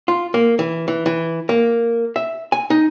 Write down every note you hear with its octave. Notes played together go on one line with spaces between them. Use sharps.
F4
A#3
E3
E3
E3
A#3
E5
G#5
D#4